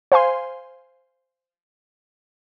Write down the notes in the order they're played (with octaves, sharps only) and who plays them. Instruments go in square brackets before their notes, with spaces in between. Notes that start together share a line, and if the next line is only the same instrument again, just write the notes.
[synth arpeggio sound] C5 F5 G#5 C6